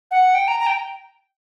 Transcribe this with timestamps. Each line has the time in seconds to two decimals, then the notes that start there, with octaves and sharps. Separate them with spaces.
0.11 F#5
0.34 G5
0.48 A#5
0.60 A#5
0.66 G5